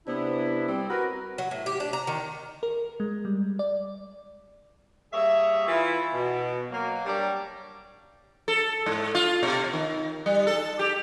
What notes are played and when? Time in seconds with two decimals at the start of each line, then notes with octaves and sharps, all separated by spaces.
0.07 C3 B3 D4 E4
0.68 G3 C4
0.90 F#4 A#4 B4
1.38 F#3
1.51 A2
1.66 G4
1.80 D4
1.93 A#5
2.07 D#3
2.63 A#4
3.00 G#3
3.25 G3
3.59 D5
5.13 G3 A#3 G#4 C#5 E5
5.68 E3 E4 F4
6.13 B2
6.71 F#3 A#3
7.06 G3 D4 G4 A#4 C#5 D5
8.48 A4
8.86 G#2
9.15 F4
9.43 B2
9.73 D#3
10.26 G3
10.47 A4
10.79 G4